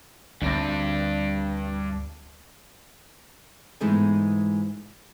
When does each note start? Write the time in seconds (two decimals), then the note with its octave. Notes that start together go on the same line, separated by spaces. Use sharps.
0.42 D2 G2 C4 D4
3.81 G#2 E3 G#3 A3 B3 D#4